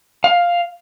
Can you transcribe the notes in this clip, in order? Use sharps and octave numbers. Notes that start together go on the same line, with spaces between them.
F5